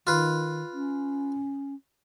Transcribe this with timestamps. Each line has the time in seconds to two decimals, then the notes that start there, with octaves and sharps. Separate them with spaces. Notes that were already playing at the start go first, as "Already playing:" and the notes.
0.07 D#3 F4 B4
0.74 C#4